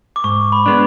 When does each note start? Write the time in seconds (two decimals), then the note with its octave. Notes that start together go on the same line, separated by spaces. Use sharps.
0.16 D6
0.24 G#2 C#6
0.52 B5
0.66 G#3 B3 D4